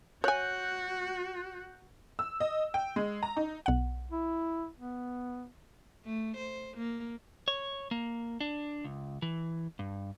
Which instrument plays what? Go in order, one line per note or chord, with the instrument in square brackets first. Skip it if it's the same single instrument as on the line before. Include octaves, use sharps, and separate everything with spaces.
[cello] F#4 [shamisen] C#5 G#5 [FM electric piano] F#6 G6
[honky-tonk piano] E6
D#5
G5
G#3
A#5
D#4
[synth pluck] B1 F#5
[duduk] E4
B3
[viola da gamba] A3
C5
A#3
[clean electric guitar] C#5
A#3
D4
C#2
E3
G2